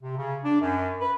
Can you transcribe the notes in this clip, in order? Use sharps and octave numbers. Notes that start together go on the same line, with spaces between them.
C3
C#3
D4
F#2
B4